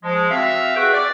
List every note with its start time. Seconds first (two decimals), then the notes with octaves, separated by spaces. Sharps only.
0.03 F3 G#3
0.30 C4 F#4 E5 F5
0.76 F#4 G#4 B4 E5 F#5 G5
0.93 D5